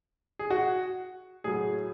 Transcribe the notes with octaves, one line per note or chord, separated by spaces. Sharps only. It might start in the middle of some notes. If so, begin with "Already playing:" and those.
G#4
F#4
A2 F#3 G#4